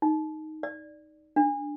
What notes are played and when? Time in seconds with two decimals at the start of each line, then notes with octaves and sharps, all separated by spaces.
0.02 D#4
0.63 D5
1.36 D4